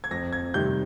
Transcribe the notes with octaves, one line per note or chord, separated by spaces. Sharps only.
G#6
F2 A#6
G#6
C3 D#3 G3 G6